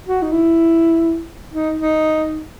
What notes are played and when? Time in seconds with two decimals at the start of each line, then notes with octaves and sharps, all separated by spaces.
0.07 F#4
0.22 D#4
0.32 E4
1.53 D#4
1.78 D#4